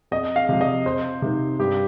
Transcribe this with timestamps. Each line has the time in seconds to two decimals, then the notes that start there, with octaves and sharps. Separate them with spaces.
0.11 F2 D#5
0.36 F5
0.49 C3 F3
0.61 D#5
0.86 F2 C5
1.22 C3 D#3
1.59 G2 G4